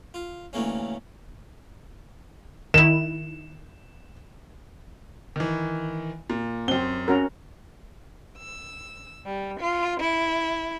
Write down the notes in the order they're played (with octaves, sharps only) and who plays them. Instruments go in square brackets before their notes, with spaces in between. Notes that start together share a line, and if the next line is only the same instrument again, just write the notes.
[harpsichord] F4
D2 E3 A3 A#3 C#4
[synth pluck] D#3 E4 [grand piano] E7
[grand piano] D#3 E3
A#2
[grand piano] F#2 G7 [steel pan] C4
[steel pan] C#4 F#4 A#4
[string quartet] E6
G3
F4
E4